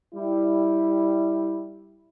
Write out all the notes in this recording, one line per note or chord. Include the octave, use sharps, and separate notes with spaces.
G3 E4